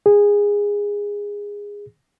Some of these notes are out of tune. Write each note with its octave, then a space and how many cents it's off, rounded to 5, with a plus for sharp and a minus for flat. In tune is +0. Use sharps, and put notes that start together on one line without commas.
G#4 -20